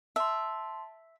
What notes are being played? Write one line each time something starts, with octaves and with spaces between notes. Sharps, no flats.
E5 A5 C6